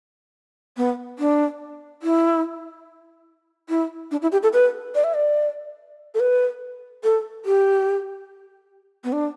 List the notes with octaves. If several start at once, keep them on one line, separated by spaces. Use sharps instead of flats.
B3
D4
E4
E4
D4
E4
G4
A4
B4
D5
E5
D5
A4
B4
A4
G4
B3
D4